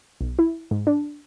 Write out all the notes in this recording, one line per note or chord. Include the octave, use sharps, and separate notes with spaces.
B1
E4
G#2
D4